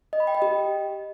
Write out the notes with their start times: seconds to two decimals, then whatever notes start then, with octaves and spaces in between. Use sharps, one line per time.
0.13 D#5
0.20 B5
0.27 G5
0.35 D#5
0.42 G4